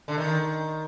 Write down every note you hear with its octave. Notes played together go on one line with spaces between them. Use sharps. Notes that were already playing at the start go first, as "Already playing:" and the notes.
D3
D#3